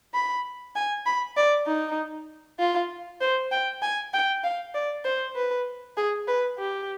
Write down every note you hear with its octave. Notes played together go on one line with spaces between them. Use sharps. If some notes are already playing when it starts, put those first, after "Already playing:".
B5
G#5
B5
D5
D#4
F4
C5
G5
G#5
G5
F5
D5
C5
B4
G#4
B4
G4